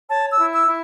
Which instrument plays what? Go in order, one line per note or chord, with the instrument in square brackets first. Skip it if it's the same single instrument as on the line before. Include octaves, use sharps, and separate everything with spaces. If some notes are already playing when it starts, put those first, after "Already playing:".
[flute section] C#5 A5
E6
E4
E6
E4